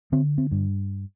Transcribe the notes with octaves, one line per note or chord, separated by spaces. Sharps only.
D3 C4
C4
G2